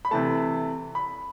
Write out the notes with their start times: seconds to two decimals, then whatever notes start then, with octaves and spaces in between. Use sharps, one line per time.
0.05 B5
0.11 C3 E3 A3 A5
0.95 B5